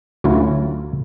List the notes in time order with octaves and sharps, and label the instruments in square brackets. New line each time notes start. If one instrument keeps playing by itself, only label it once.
[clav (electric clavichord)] D2 F#3 C#4 E4 F4